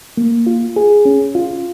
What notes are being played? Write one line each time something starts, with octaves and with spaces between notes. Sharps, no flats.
A#3
F4
G#4
C#4
F4